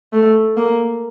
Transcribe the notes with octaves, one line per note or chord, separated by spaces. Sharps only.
A3
A#3